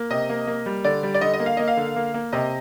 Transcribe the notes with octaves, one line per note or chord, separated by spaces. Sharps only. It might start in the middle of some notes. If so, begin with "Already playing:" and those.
Already playing: A#3
C3 D#5
A#3
A#3
G3
D3 D5
G3
D5
D3 D#5
D#5
A#3
F5
A#3 D#5
F5
D3
A#3
A#3
C3 D#5